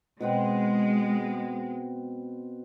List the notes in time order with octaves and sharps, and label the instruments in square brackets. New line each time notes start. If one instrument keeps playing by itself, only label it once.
[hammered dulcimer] B2 B3 C4 [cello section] G#3